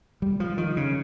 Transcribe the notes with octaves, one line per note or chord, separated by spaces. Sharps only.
G3
F3
D#3
C#3